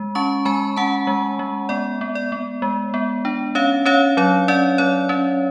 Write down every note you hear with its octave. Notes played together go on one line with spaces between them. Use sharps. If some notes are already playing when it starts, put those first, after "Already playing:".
Already playing: G#3
C#4 A5 C#6
G#3 G#5 B5
C#4 F#5 A5
G#3
G#3
B3 D5
B3
D5
B3
G#3
B3
D4
C#4 C#5 F5
C#4 C#5 F5
F#3 C#5
C#4 D5
F#3 C#5
C#4